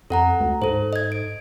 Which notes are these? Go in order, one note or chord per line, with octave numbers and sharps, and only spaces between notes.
F2 A4 F#5 A#5
D2
G#2 A4 C5
D#5 G#6
D7